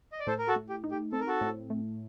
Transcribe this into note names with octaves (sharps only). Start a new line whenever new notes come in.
D#5
D5
A2 A4 C5
A#4
F#4 A4
A3
G4
D#4
G4
C4 A4
A#4
F#4 A4
A2
A3